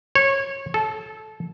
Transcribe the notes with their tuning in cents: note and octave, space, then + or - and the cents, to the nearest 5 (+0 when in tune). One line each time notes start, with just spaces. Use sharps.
C#5 -20
A4 -20